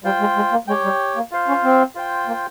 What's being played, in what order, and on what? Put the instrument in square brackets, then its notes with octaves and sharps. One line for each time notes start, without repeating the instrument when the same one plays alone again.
[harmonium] G3 [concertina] F4 C5 G5
[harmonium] G#3
G#3
A#3
[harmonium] G#3 [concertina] G4 C#5 G5
[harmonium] G3
A#3
[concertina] F4 C5 F5
[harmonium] C#4
C4
[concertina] F4 C5 G5
[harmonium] A#3